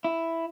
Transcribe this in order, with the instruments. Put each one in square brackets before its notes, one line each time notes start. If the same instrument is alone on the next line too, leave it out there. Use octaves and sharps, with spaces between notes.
[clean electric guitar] E4